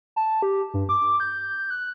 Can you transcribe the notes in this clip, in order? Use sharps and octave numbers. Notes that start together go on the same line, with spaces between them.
A5
G4
G2
D6
G6
F#6